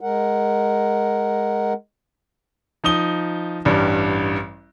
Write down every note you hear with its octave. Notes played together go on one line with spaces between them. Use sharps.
G#3 A#4 F#5
F3 D#4 D#6 G7
A1 G2 G3